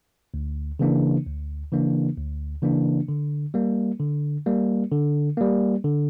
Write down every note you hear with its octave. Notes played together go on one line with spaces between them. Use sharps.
D2
C#3 E3 A#3 D4
D2
C#3 E3 A#3 D4
D2
C#3 E3 A#3 D4
D3
G3 A#3
D3
G3 A#3
D3
G3 A#3
D3